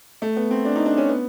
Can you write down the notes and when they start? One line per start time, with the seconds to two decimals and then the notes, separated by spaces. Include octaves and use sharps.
0.22 A3
0.36 B3
0.51 C4
0.65 D4
0.76 D#4
0.86 D4
0.97 C#4
1.09 B3